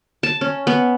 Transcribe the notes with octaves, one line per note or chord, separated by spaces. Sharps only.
A5
C#4
B3